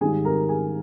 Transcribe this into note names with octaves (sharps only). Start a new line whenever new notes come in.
G#2 D#3 G3 G#4 G#5
A#4 A#5
G#4 G#5